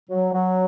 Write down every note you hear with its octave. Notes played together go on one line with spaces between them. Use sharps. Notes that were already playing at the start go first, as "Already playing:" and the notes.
F#3
F#3